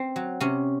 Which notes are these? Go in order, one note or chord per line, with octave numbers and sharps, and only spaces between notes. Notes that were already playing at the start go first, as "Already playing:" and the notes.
Already playing: C4
F#3
C3 C#4